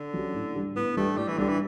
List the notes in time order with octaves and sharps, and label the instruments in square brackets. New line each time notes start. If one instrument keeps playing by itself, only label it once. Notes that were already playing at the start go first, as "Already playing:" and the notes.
Already playing: [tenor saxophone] D3
[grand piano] F#3 C#4 G4
A2
G3 D4 G4
[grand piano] A2 [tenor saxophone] B3
[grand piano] G3 D4 G4 [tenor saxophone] A3
[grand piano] A2 [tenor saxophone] G3
[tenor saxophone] E3
[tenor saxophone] D3 [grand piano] G3 D4 G4
[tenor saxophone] E3